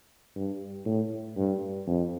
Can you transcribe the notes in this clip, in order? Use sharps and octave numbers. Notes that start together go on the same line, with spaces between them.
G2
A2
G2
F2